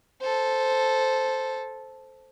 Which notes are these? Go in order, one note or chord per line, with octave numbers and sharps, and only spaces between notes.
A4 C5